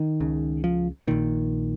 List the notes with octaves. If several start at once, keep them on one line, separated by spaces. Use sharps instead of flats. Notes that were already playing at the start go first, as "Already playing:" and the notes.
Already playing: D#3
C#2 C#3
F3
A#1 A#2 D#3